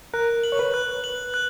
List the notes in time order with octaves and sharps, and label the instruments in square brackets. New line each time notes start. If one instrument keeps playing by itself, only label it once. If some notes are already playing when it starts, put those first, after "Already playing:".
[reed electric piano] A#4 [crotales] F#6
[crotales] F#7
[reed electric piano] C#5
B4
[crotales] F#6
F#7
F#6